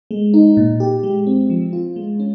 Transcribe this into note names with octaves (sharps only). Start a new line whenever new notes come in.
G#3
D#4
A#2
G4
G#3
C4
F3
F4
G#3
C#4